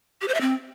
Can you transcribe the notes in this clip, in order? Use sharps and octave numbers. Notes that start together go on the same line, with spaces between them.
G4
C5
E5
C4